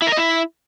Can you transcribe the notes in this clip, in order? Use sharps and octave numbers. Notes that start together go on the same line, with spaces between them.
E4
A#4
D#5
E4